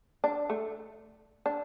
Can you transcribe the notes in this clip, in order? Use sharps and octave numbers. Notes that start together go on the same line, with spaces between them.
D4
A3
D4